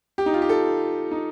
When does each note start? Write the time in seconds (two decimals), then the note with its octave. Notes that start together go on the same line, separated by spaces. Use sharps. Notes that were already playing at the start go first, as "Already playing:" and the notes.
0.18 G4
0.26 D#4
0.34 F4
0.42 G4
0.49 A4
1.11 D#4